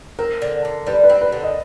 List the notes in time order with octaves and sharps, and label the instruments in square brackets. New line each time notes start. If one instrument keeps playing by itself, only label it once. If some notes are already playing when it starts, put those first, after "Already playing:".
[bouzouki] C4 [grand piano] A#4
[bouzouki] D3
D3
[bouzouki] G3 [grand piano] B4
[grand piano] B4
[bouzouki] C4
[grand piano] B4
[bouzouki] D3
[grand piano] D#5